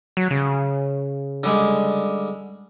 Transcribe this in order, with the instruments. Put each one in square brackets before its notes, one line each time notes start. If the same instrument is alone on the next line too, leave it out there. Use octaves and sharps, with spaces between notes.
[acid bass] F#3
C#3
[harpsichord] D3 G3 G#3